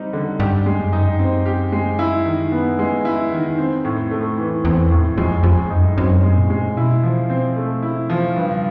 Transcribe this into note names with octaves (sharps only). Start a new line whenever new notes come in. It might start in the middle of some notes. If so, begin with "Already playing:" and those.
Already playing: G3 C4 D#4
D3
G2 G4
G#3
F#2
D#4
C4
G4
G#3
E4
D#3
B3
F2 G#3
E4
D#3
C4
A2
A3
E2 E3
E2 C4
F2 A2
F2 G#3
F2 G#3
F#2 D#4
F#2 C4
G#3
A#2
G#3
B2 E4
F3
C4
A3
E4
F3
G2 C#3